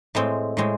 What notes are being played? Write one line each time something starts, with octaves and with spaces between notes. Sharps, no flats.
A2 G#3 C4
A2 G#3 C4